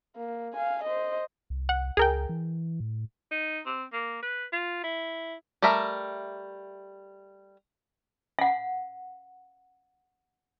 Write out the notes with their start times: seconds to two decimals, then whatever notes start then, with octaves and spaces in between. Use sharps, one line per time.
0.16 A#3
0.53 F5 G#5
0.83 C5 D#5
1.50 C2
1.69 F#5
1.97 C#2 G#4 A#4 G5
2.29 E3
2.80 A2
3.31 D#4
3.66 C4
3.93 A#3
4.22 B4
4.53 F4
4.84 E4
5.62 G3 A3 A#4 E5 A#5
8.39 F5 F#5